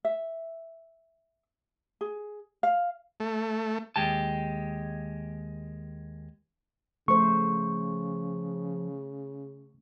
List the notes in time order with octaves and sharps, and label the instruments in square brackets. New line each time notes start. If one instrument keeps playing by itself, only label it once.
[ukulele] E5
G#4
F5
[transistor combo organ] A3
[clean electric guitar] D#2 G#3 G4 A5
[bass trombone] C#3 [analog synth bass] F3 [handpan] A3 C5 [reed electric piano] C#6